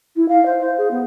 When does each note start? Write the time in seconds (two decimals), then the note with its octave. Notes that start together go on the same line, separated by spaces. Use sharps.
0.16 E4
0.28 F5
0.46 C5
0.60 C5
0.78 G#4
0.91 B3